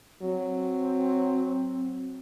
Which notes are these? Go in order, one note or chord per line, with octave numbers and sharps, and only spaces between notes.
F#3 C4